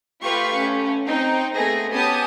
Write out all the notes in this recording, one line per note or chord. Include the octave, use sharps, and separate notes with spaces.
A3 F4 G4 B4 F5 C#6
A3 C#4
C4 D#4 G5
A3 B3 G#4 A#6
B3 C#4 G4 G#5 A5 D#6